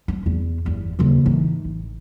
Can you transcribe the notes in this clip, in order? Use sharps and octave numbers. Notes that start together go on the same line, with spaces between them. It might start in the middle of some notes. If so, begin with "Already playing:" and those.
C#4
E2
G1 E2
D#2 C#3
E3 D#4
A1